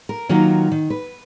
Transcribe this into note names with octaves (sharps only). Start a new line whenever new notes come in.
A#4
D#3 F#3 A#3 F4 F#4
D#3
B4